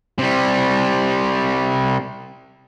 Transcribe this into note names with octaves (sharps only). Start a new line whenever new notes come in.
C3 G3